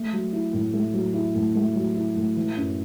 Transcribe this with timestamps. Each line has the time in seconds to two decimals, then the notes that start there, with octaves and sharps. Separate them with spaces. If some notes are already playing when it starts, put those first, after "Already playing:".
Already playing: A3
0.13 F#3
0.33 E4
0.53 A2
0.74 A3
0.93 F#3
1.14 E4
1.35 A2
1.55 A3
1.75 F#3
1.95 E4
2.16 A2
2.36 E3
2.57 F#2